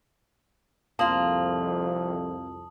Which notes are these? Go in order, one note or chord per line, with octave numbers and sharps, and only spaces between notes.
C2 F2 A#3 F4 A5 D#6 F#7